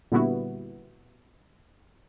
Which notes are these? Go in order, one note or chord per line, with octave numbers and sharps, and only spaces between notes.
A#2 D3 G3 B3 E4 F#4